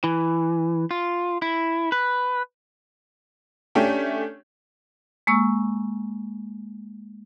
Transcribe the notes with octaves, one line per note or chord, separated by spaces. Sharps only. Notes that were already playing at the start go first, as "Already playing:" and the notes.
E3
F4
E4
B4
A3 C#4 D4 G4
G#3 A#3 C#6 E6